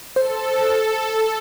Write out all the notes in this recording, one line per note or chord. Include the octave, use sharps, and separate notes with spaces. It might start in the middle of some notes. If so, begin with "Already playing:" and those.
A4 C5